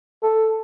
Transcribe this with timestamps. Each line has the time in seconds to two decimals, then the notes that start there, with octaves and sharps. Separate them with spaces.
0.23 A4